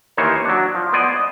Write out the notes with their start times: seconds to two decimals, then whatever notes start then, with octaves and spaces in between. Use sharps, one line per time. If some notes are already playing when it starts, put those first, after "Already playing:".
0.17 D#2 E3 A#3 D#4 C5 C#5
0.45 F#3 D4
0.75 F3
0.93 B3 C5 D5 D#5 G#5
1.15 D#5